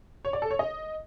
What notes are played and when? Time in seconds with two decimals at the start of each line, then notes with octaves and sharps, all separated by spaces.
0.25 C#5
0.33 D5
0.42 A4
0.51 C#5
0.59 D#5